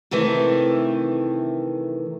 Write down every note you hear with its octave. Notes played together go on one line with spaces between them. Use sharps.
C3 D#3 E3 A3